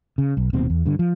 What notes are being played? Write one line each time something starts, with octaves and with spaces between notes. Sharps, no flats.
C#3
B1
D#1 D#2 B2 C4
E2
G2 D3
F3